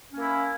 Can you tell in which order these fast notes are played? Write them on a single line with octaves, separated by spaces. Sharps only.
C#4 A#3 E4